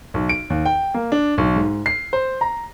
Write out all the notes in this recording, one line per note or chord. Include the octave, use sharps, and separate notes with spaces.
B1
D7
D#2
G5
A#3
D4
B1
G#2
C7
C5
A#5